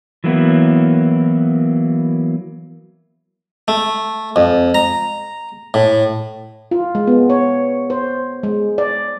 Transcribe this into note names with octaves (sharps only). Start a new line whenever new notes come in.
E3 F#3 A#3 B3 E4
A3
F2
A#5
A2
F4
G#3
B3
C#5
C5
G#3
D5